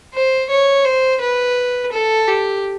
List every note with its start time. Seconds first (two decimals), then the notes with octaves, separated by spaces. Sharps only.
0.14 C5
0.50 C#5
0.85 C5
1.21 B4
1.92 A4
2.28 G4